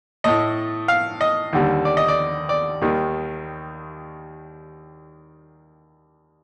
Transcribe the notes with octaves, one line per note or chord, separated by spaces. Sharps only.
A2 A3 D#5
F5
D#5
D#2 D3 G3
D5
D#5
D5
D5
D#2 D#3 G3